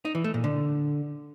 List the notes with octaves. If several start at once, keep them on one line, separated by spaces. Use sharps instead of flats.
D#4
E3
A3
A#2
D3